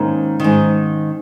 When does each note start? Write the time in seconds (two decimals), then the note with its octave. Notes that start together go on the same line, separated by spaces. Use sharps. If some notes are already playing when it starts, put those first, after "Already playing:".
Already playing: G#2 D#3 A#3 C#4
0.40 G#2 D#3